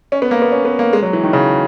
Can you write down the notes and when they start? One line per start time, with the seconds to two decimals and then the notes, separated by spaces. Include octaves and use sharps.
0.12 C#4
0.22 B3
0.31 A#3
0.42 B3
0.52 C#4
0.65 B3
0.79 A#3
0.93 G#3
1.03 F#3
1.13 E3
1.23 D#3
1.33 C#3